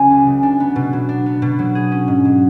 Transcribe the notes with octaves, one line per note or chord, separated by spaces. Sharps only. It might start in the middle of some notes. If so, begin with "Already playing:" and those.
Already playing: C#3 F#3 C#4 G#5
C#2
C#3
D4
B3
B2
F#3
D4
B3
B2
F#3
G#4
C#4
G#2
F#3